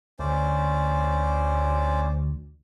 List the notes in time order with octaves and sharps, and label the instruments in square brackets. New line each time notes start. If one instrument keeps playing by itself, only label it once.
[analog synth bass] D2 [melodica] C#4 C5 D5